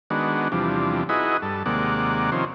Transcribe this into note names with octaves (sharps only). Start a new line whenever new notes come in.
D#3 G#3 B3 D4 F#4
E2 C3 F3 G3 D4
D#4 E4 F#4 G#4 B4 D#5
G2 A4
D#2 C3 G#3 A#3 D5 F#5
C3 D#3 F3 C#4 C5